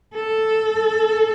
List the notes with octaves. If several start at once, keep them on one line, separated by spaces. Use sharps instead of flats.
A4